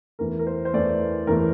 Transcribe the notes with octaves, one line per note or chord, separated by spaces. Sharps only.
E2 E3 A3 A#4
A#4
C5
C5
E2 E3 A3 D5
E2 E3 A3 A#4